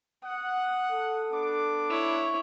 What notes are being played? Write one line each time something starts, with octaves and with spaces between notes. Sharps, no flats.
F#5 D#6
A4
B3 D4 D6
E4 C#5